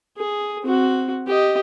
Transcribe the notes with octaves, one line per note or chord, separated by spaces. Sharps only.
G#4
C4 F#4
G4 D#5